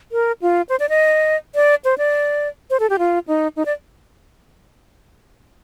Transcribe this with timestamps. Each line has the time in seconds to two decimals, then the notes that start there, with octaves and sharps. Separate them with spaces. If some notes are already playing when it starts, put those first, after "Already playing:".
0.12 A#4
0.42 F4
0.69 C5
0.80 D5
0.89 D#5
1.55 D5
1.85 C5
1.98 D5
2.70 C5
2.80 A4
2.90 G4
2.99 F4
3.28 D#4
3.56 D#4
3.66 D5